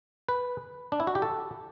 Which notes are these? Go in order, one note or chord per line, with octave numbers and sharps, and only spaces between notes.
B4
D4
E4
F#4
G4
A4